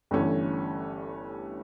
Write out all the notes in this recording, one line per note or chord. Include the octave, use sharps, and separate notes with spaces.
G1 G2 E3 A3 C#4